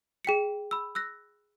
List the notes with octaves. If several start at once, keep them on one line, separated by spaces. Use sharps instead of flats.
G#4 G5 B6 C#7
B5 E6
E6 F#6 A#6